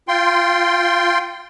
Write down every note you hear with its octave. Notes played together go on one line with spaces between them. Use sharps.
F4 G5 C6